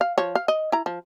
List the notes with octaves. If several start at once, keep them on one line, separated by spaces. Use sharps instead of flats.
F5
F3 C#5
F5
D#5
E4 A#5
F3